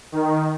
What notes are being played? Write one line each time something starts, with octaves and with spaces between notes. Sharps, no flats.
D#3